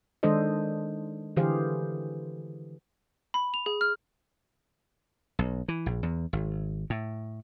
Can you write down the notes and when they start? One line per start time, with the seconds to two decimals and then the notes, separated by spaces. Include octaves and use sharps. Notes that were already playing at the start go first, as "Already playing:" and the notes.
0.23 D#3 G#3 D4 A4 C5 D#5
1.37 D3 E3 G4 G#4 C5 F5
3.34 B5
3.54 F7
3.66 G#4
3.81 F6
5.39 B1
5.68 E3
5.86 A#1
6.03 E2
6.33 G#1
6.90 A2